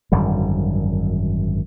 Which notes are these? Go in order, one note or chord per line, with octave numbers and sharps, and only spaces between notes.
G#1 F#2 D3 G3